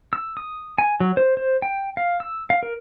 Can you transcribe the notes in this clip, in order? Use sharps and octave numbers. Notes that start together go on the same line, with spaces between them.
E6
D#6
G#5
F#3
C5
C5
G5
F5
E6
F5
A#4